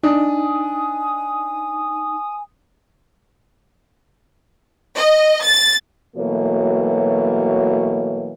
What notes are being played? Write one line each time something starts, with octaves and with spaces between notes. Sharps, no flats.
D4 D#4 G#5 D#6
D#5
A6
B2 E3 F#3 A3 A#3 C#5